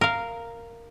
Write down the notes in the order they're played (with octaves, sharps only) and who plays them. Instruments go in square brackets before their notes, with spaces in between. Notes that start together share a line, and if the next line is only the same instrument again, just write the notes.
[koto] A#4 F5